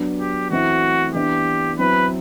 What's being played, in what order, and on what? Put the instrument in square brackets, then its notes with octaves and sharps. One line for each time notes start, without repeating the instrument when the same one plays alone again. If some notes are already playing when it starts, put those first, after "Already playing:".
Already playing: [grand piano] F#3 B3 D4
[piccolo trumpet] G4
[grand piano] E3 A3 C4 E4 [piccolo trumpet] F#4
[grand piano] E3 B3 D4 [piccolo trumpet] G4
[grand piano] F#3 C4 E4 [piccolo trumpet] B4